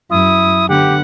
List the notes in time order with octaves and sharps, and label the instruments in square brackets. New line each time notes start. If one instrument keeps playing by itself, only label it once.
[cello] F#2 [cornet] E4 [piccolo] D#6
[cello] D3 B3 [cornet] G4 [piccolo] F#5